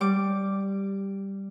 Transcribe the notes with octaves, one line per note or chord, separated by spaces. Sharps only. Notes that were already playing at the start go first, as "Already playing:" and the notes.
G3 D6